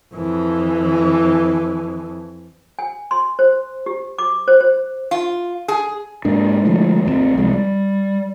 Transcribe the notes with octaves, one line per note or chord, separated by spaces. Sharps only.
F2 E3
G#5
C6
C5
G4
D6
C5
C5
F4
G#4
G#2 G#3 A#3 D4
D3 F3 G#3 A3
A1 E2 A3 C4
C2 F3 G#3 C4
G3